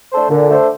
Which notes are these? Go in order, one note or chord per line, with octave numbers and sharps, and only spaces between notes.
A3 D4 A4 C5
A#2 D3
A3 D4 A4 C5